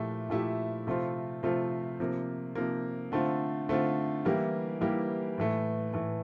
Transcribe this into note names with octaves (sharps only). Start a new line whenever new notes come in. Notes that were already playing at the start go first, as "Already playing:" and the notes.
Already playing: A#2 F3 A3 E4 G4
A#2 F3 A3 E4 G4
C3 F3 A3 C4 F4
C3 F3 A3 C4 F4
C3 F3 A#3
C3 F3 A#3
D3 A3 C4 F4
D3 A3 C4 F4
E3 G3 A#3 E4 G4
E3 G3 A#3 E4 G4
A2 E3 A3
A2 E3 A3